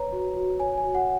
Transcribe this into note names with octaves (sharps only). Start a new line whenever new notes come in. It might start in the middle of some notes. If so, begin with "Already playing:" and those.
Already playing: B4 C#5 A#5
F#4
F#4
C#5 G#5
G#5
F#4
F#5